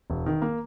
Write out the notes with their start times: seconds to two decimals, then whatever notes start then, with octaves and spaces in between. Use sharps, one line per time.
0.10 E1
0.26 D#3
0.42 A#3